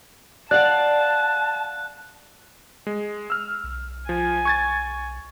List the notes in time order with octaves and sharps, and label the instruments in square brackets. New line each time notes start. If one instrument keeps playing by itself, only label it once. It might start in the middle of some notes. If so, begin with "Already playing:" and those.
[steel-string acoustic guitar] D5 F5 F#5 [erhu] A5 [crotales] F#6
[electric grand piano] G#3
E6 F6
[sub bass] B1
[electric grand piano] F3 [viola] G#5
[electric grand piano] C#6 G#6 A6